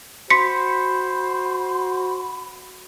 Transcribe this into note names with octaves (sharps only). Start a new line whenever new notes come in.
F#4 C5 B5 C6 B6 C#7